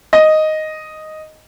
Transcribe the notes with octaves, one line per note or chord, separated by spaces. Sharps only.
D#5